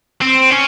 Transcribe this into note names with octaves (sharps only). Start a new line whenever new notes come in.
C4
C#4